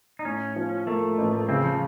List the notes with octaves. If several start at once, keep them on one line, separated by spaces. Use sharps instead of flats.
D#4
A2 C#4
F3
A3 A#3
A1
C#3 C4
F3